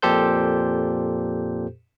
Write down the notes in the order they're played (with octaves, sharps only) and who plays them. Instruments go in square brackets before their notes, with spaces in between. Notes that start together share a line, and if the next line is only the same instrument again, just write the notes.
[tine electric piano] F2 A#2 G4 A4 C5 G6